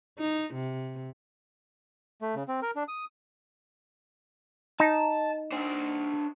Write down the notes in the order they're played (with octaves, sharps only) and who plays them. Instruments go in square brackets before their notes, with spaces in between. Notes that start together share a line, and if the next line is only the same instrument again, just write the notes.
[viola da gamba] D#4
C3
[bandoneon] A3
C#3
C4
A#4
D4
D#6
[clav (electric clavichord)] D#4 [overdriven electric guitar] A5
[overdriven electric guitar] D4 C5